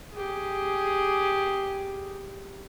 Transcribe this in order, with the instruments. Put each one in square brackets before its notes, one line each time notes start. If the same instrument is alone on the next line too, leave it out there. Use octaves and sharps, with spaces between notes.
[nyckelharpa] G4 G#4